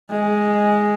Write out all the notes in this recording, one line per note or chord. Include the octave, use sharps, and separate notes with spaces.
G#3